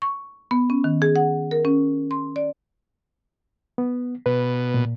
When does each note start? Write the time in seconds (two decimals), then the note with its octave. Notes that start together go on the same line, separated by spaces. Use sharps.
0.02 C#6
0.51 B3
0.70 C#4
0.84 D#3
1.02 G#4
1.16 F#5
1.51 A#4
1.65 C#4
2.11 C6
2.36 D5
3.78 B3
4.26 B2 B4
4.74 A#2